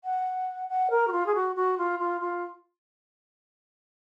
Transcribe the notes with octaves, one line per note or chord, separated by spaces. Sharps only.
F#5
F#5
A#4
F#4
F4
G#4
F#4
F#4
F4
F4
F4